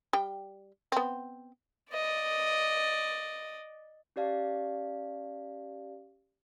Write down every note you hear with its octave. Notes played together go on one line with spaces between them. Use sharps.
G3 G5
B3 C4
D5 D#5
C#4 G4 D5 F5 A5